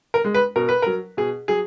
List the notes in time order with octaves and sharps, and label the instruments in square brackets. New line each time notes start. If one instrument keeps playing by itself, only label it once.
[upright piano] A#4
G#3
B4
B2 A#4
B4
F#3 A#4
B2 G#4
F#3 G#4